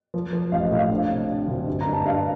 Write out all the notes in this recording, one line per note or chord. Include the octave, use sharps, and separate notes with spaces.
F3
F3
A1 F5
D#5
A2
F5
D4
C3
D4
D2
G2
A#5
G2
A5
G2 F5